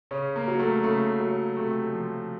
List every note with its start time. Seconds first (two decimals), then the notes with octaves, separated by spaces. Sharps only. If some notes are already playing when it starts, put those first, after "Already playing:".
0.11 C#3 C#4
0.36 A#3
0.48 F#3
0.59 A3
0.83 C#3 A3
1.20 F#3
1.56 C3 A3
1.93 F3